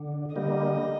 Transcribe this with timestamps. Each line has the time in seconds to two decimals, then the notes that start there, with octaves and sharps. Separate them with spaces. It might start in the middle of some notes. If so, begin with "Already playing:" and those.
Already playing: D3
0.35 D3 G3 A#3 D#5